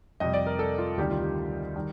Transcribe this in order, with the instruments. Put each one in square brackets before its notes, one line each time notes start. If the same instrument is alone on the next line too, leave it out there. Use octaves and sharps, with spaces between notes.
[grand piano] F2 C3 G3 D#5
D5
A#4
A4
F4
D2 C3 D#3 G3 G4
F4
G4
D#3 G3